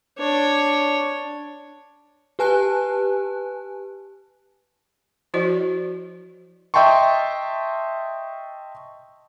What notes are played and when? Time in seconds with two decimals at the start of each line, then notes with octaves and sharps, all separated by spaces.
0.19 D4 C#5
2.39 G4 B4 G#5 A5 F#6
5.34 F3 E4 F#4 C5 D5 D#5
6.74 D#5 E5 G5 A5 C6 C#6